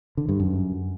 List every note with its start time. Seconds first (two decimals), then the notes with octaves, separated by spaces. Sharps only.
0.17 D3
0.29 G2
0.40 F#2